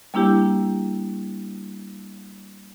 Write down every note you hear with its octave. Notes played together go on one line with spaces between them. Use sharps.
G3 A#3 D4 E4 G4